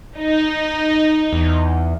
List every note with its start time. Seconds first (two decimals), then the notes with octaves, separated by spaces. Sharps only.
0.18 D#4
1.33 E2